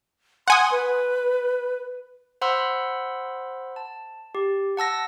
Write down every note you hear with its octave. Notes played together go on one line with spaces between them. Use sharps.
F#5 G#5 C6 D#6
B4
C5 F#5 B5 C6 E6
A5
G4
F#5 A5 E6 A#6